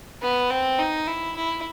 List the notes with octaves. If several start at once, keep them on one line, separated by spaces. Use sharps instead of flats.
B3
C4
D#4
E4
E4